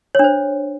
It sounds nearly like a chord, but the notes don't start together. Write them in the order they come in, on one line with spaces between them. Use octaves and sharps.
C#5 D4 C5